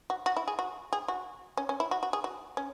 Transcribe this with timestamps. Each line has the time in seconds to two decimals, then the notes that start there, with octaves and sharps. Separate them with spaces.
0.10 F#4
0.26 F#4
0.37 E4
0.48 G#4
0.59 F#4
0.93 G#4
1.08 F#4
1.57 C#4
1.69 C#4
1.80 E4
1.91 F#4
2.03 F#4
2.13 G#4
2.24 F#4
2.57 C#4